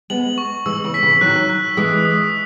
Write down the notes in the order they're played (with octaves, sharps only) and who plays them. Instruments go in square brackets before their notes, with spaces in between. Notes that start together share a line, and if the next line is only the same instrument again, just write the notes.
[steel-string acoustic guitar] G#3 B3 [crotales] F#7
[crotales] C#6
[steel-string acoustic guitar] E3 G#3 [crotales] E6
[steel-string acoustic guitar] C#3 E3
[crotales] B6
[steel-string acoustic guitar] C#3 E3
[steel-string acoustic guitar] D#3 F#3 [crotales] F#6
[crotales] F#6
[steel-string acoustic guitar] E3 G#3 [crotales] D#6
[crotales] D#6